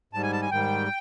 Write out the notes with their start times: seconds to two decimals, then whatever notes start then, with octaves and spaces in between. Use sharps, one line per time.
0.13 G#2 D#3 G3 A5
0.23 G#5
0.32 A5
0.42 G#5
0.51 G#2 D#3 G3 G5